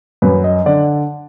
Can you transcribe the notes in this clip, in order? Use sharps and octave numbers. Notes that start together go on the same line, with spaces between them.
F#2 B4
D#5
D3 D5